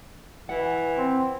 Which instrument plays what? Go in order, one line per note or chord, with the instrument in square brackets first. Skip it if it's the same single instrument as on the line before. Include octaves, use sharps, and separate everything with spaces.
[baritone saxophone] E3 [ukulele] F#5
[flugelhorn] C4